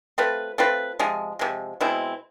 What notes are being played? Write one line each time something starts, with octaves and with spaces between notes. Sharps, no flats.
A3 C4 F4 B4
A3 C4 F4 B4
C3 F3 G#3
C3 F3 G#3
B2 G#3 C4 E4